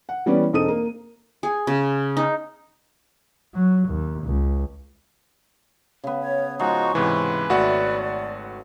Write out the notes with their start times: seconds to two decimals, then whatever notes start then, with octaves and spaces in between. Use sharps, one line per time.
0.09 F#5
0.26 E3 G3 B3 C#4 D5
0.53 E1 C4 D#4 A4 D#6 D#7
0.68 A#3
1.43 G#4
1.67 C#3
2.17 D#4
3.55 F#3
3.89 D#2
4.24 C#2
6.04 C#3 B3
6.22 C#5
6.59 F3 G#3 D#4 F#4 C#6
6.95 G#2 C3 E3 B4
7.50 G#1 A3 F#4 D5 F#5